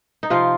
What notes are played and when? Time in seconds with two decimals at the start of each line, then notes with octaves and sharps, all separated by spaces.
0.23 D#4
0.30 C3 F3 F4